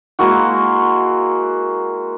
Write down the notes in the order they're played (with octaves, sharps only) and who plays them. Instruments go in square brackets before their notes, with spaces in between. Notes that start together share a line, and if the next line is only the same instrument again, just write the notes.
[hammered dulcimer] G#3 A#3 E4 F#4